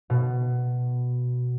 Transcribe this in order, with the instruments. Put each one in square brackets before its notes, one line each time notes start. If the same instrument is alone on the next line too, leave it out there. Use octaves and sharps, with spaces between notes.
[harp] B2